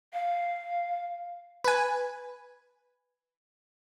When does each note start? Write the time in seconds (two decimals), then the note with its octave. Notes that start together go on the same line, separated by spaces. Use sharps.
0.13 F5
1.64 B4 G#5